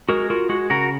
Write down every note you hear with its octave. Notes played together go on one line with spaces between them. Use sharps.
G#3 F#4 A#4
F4 F#4 A#4
G#3 F#4
C#3 F#4 A#4